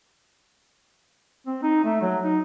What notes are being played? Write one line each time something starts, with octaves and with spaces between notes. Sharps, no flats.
C4
D#4
A3
F#3
D#4